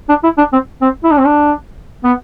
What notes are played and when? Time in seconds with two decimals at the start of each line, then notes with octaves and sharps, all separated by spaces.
0.09 D4
0.24 E4
0.38 D4
0.53 C4
0.82 C4
1.04 E4
1.11 D4
1.18 C4
1.26 D4
2.04 B3